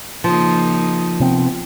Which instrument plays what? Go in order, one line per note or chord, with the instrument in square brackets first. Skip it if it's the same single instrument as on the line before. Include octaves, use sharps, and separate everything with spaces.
[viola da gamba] C#3 A#3 D#4 [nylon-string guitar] F3
[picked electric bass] C3 B3 C4